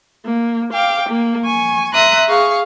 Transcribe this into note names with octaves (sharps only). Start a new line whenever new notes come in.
A#3
F5 G5 D6
A#3
G#5 C#6
E5 A#5 C6 D#6 F#6
G#4 F5 C#6